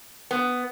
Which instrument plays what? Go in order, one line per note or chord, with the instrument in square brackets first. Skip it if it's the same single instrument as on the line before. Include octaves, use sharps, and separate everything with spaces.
[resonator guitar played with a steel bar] B3